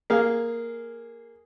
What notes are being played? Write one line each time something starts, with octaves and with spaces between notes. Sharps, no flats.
A#3 G#4 F5